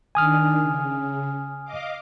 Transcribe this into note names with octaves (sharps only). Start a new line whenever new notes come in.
D#3 D4 G#5 D#6 F6
C#3
D#5 F5 D6